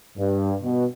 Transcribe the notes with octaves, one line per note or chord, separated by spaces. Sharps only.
G2
B2